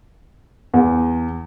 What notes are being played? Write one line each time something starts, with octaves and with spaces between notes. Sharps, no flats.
E2